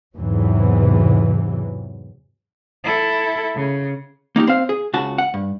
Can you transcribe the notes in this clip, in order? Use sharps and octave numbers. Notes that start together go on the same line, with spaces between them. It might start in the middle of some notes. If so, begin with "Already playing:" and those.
E2 G#2 C3 E3 F#3
E4 A4
C#3
A#3 D#4 F#4 G4
C4 C5 F5
G#4
C#2 C#3 F#4 A5
F#5
G2